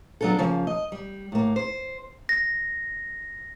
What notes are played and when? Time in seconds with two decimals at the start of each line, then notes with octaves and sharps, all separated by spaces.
0.21 F#3 B3 D4 F4 A4
0.39 C#3 F3 A#3
0.67 D#5
0.92 G3
1.32 A2 A#3
1.56 C5
2.29 A#6